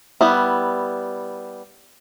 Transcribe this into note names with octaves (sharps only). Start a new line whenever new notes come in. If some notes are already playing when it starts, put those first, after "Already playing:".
G3 B3 E4